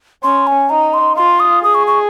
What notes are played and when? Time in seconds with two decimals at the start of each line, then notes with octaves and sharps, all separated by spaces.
0.23 C#4 C6
0.47 G#5
0.70 D#4 A#5
0.94 C6
1.17 F4 C6
1.40 D#6
1.64 G#4 D#6
1.75 C#6
1.87 C#6